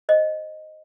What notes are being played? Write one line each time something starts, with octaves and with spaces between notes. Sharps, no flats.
C5 D#5